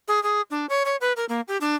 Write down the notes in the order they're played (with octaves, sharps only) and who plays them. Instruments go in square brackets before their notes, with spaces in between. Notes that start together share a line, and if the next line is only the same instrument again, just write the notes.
[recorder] G#4
G#4
D4
C#5
C#5
B4
A#4
A#3
G4
D4